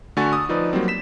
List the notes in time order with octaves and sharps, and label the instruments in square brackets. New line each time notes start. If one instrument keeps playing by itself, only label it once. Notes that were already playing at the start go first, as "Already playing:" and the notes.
[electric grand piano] D3 A3 F#4 G#5 C#6 A6
D#6 E6
F3 D#4 B4 D5
F#3 G3 A#3 C4
B6 E7